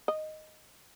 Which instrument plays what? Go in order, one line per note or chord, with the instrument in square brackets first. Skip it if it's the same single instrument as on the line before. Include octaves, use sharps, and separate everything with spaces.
[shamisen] D#5